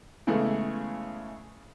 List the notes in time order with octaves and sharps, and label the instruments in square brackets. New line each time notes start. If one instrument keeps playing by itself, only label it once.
[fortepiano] C#3 E3 G#3 A3 B3